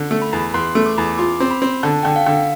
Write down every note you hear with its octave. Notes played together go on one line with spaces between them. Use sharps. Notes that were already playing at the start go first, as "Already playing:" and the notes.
Already playing: D3
A3
B5
E2
E2 C6
A3
D6
E2
F4 D6
C4
B5
C4
D3 A5
D3 G5
F5
D3